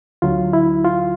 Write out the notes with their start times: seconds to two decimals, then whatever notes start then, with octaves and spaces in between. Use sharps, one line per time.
0.22 D2 D3 F#3 F4
0.53 E4
0.85 F4